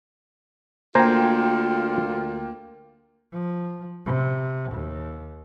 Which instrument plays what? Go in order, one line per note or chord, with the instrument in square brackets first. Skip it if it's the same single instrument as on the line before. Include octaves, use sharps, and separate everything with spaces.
[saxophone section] D2 F4 [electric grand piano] A#3 G5 [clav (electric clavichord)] C5 G#5 A#5
[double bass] F3
C3
D#2